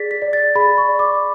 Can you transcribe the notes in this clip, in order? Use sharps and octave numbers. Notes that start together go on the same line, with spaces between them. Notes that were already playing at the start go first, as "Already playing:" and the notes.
Already playing: G#4 D5 A6 B6
B6
D5
A6
G#4 B5
C#6
D5
D6